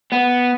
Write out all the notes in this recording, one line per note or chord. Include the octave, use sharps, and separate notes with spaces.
B3